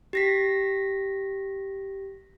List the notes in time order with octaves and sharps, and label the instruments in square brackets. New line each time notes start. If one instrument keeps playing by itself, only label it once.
[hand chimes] G4 A#6 B6